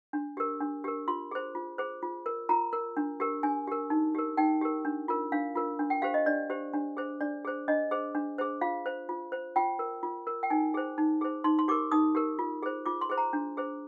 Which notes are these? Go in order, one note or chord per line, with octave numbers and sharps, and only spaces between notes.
D4
G4 A#4
D4
G4 A#4
F4 C6
G#4 C5
F4
G#4 C5
F4
A#4
F4 A#5
A#4
D4
G4 A#4
D4 G#5
G4 A#4
D#4
G4 A#4
D#4 G5
G4 A#4
D4
F4 A#4
D4 F5
F4 A#4
D4
G5
G4 C5 F5
D#5
D4 D5
G4 C5
D4
G#4 C5
D4 D5
G#4 C5
D4 D#5
G#4 C5
D4
G#4 C5
F4 F5
C5
F4
C5
F4 G5
A#4
F4
A#4
G5
D#4 G#5
G#4 C5
D#4
G#4 C5
D#4 C6
C6
G4 A#4 D6
D#4 D#6
G4 A#4
F4
G#4 C5
F4 D6
C6
G#4 C5
A#5
D4
G#4 C5